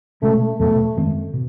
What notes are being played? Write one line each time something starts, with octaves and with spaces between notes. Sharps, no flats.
B2 G#3 A3 C#4
E2 B2 F#3 A3
F#2 D#3 G#3 C4
B2